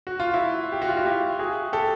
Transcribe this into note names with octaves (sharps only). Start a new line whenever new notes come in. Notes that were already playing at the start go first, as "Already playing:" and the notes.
F#4
F4
E4 F#4
G4
F#4
F4
E4 F#4
F4 G4
F#4 G#4
G4 A4